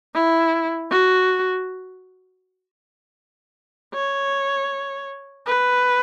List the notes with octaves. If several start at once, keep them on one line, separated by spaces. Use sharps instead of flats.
E4
F#4
C#5
B4